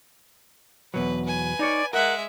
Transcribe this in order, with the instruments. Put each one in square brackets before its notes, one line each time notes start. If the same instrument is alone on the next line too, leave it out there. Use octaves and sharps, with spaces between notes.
[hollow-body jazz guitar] E2 B2 F#3 [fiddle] B4
[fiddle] B4 G#5
[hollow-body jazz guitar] D#4 C#5 [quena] D5
[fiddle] G#3 E5 [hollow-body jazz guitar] A#4 [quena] F#5